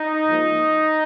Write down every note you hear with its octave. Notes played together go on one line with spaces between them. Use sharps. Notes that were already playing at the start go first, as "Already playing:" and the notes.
Already playing: D#4
G#2 F3 A#3